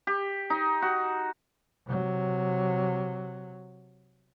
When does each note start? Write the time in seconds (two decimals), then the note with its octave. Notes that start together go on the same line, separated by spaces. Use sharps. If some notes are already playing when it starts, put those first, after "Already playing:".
0.07 G4
0.50 D#4
0.82 F#4
1.87 C3 F#3